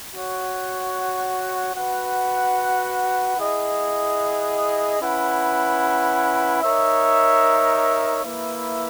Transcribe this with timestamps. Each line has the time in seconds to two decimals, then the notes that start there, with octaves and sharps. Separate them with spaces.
0.14 F#4 C#5 F#5
1.75 F#4 B4 F#5
3.38 E4 G#4 D#5 F#5
5.00 C#4 E4 B4 F#5
6.61 D#4 A#4 C#5 E5
8.24 A#3 E4 B4 E5